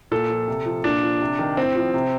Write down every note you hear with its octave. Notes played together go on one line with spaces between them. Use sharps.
A#2 A4
F3
C3
F3
A#2 D4
F3
C3
D#3
A2 C4
F3
C3